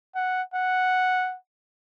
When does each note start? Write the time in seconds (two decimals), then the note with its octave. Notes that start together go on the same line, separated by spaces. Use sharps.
0.15 F#5
0.54 F#5